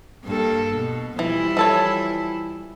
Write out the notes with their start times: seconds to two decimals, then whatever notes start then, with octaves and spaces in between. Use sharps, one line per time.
0.24 G2 A#3 A4
0.73 B2
1.19 E3 F3 G3 E4
1.57 E3 A4 C#5